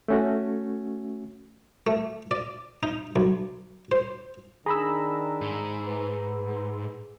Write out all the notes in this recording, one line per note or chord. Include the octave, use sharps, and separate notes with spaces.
A3 C#4 F#4
A3
D5
D#4
B1
C5
D#3 D4 G#4 A#5 B5 E6
G#2
B4